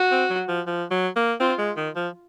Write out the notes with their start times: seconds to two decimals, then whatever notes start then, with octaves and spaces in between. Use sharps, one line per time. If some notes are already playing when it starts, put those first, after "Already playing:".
Already playing: F#4
0.12 C4
0.30 F#3
0.48 F3
0.67 F3
0.91 F#3
1.16 A#3
1.40 C4 F4
1.59 G#3
1.77 D#3
1.96 F3